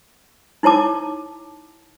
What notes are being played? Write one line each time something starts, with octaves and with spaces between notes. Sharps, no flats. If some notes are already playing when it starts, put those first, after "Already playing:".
D#4 E4 C#5 A5 D6